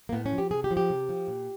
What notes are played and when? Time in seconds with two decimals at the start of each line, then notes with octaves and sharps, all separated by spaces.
0.09 A#3
0.12 A2 B3
0.26 C#4
0.32 F3
0.38 G4
0.51 C3 G#4
0.64 G4
0.71 F3
0.77 G4
0.90 C3
1.09 F3
1.28 A#2